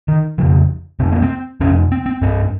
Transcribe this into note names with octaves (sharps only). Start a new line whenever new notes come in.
D#3
F2 C#3 F3
F2 C3 C4
A#3
C4
F2 C3 C#4
C4
C4
G2 C4